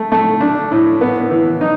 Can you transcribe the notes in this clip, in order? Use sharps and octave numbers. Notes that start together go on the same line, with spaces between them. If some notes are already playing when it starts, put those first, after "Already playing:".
Already playing: A3
A3
D4
A2
B3
E3
D#4